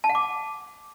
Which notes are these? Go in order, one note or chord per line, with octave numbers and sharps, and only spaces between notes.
A5
F#5
D6